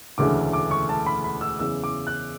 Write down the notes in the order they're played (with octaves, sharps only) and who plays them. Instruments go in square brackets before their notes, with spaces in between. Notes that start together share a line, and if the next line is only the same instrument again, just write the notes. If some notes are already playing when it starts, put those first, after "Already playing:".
[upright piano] E1 D2 C#3 E3 A3 D6
D6
C#6
A5
B5
B5
E6
F#1 E2 C#3 E3 E6
D6
F#6